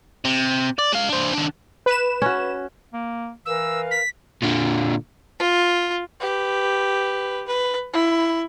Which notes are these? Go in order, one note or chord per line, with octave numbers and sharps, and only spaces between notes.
C3
D5
G#3 F5
D4 C5
D#3 D4
B4 E7
C#4 F#4
A#3
E3 A#4 B4 F5 E6
B6
A#2 D3
F4
G4 B4
B4
E4